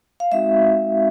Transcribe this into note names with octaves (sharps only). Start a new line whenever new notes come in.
F5
G#3 C4 D#4 F#4 E5